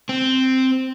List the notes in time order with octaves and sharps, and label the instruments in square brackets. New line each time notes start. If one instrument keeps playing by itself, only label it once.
[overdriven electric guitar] C4